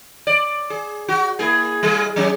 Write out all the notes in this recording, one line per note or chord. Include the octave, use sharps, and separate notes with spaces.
D5
G#4
F#4
A#3 E4 G#4
G3 G#4
F#3 C#4 G#4